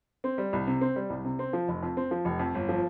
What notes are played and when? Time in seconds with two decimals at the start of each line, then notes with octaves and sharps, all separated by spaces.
0.24 C4
0.38 G3
0.53 C2
0.67 C3
0.81 C4
0.96 G3
1.10 C2
1.25 C3
1.39 C4
1.53 F3
1.68 F1
1.83 F2
1.97 C4
2.11 F3
2.25 F1
2.39 F2
2.54 G1
2.69 F3